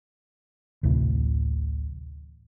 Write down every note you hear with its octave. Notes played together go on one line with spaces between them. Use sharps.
A1 D2 C3 E3